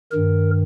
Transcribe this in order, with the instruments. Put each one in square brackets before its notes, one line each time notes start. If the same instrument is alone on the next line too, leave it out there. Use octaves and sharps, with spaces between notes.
[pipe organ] G2 D#3 A#4